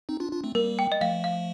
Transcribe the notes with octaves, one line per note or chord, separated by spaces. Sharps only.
C4 D#4
D4 F4
D4 F4
A3 C4
G3 A#3 A#4
G5
D#5
F3 A3 F5
F5